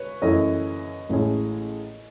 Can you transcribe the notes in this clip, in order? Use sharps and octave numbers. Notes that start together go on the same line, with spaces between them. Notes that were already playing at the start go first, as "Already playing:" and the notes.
Already playing: B4 C#5
F#2 E3 A3 C#4 D#5
A1 A2 G#3 C#4 G#4